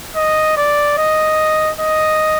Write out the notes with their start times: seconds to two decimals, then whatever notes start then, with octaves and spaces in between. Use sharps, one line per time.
0.16 D#5
0.57 D5
0.98 D#5
1.80 D#5